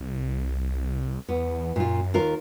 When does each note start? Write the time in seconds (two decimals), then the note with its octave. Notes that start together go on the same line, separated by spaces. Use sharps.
0.01 C2
1.29 E2 B3
1.76 F#2 A#2 F4
2.14 D#2 F4 A#4